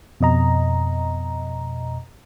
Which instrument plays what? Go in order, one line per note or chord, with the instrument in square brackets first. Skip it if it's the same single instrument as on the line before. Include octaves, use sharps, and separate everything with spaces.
[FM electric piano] F2 B2 D#5 A#5